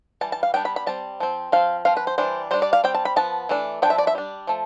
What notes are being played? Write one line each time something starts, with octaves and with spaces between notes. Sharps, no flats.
E3 G3 A5
A5
F5
G3 B3 D4 G5
B5
B5
G3 C4 A5
F3 C4
F3 C4 F5
F3 C4 F5
B4
C5
E3 G3 D4 C5
G3 D4 C5
D5
F5
G3 C4 G5
A5
B5
F3 B3 A5
E3 A3 D4
F3 B3 D4 G5
E5
D5
E5
G3 D4
F3 A3